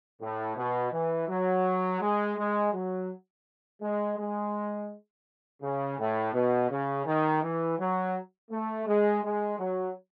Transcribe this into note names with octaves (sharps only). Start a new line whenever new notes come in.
A2
B2
E3
F#3
G#3
G#3
F#3
G#3
G#3
C#3
A2
B2
C#3
D#3
E3
F#3
A3
G#3
G#3
F#3